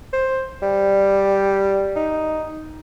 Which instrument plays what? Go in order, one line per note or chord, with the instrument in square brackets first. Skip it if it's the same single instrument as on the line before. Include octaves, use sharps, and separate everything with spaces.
[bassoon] C5
G3
D#4